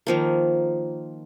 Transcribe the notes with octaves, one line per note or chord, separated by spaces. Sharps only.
D#3 F3 A#3